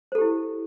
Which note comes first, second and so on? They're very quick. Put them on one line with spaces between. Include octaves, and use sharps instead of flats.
C5 A4 G4 E4